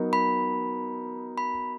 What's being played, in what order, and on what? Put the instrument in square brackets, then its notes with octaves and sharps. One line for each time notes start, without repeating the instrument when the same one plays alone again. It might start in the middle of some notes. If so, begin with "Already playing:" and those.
Already playing: [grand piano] F#3 B3 D#4 A#4
[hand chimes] B5
B5